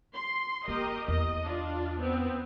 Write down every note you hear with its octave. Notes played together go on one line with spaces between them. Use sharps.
C6
A#3 G4 A#4 D#5
E2 D#5
D4 F4
B3 C4